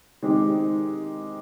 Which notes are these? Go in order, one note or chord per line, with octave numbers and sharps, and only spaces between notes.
D#3 G#3 C4 D#4 G4